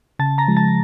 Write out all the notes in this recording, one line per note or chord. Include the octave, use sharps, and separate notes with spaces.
C#3 A5 A6
A#5 A#6
F3 G#3
A5 A6